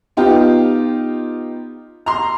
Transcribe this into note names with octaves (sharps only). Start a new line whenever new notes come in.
B3 D#4 F4 G4
A#5 C6